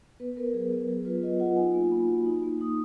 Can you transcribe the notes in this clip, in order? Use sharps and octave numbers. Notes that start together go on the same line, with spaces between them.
B3 B4
B3 A#4
F#3 G#4
B3
F#3 G#4
F4 B4
F4 D#5
F4 F#5
D#4 G#5
A#3
A#3 B5
F#4
D#4
A#3
D#4 D#6